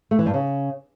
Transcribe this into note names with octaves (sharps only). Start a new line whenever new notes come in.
A3
E3
G2
C#3